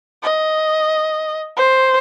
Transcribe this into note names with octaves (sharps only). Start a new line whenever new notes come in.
D#5
C5